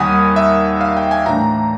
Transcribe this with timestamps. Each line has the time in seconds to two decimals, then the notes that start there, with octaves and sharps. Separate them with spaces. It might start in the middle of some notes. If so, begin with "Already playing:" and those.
Already playing: D#2 D#3 G3 F#5 G#5 B5 D#6
0.36 E5
0.81 F5
0.97 G5
1.11 G#5
1.26 A2 E3 A3 D4 A#5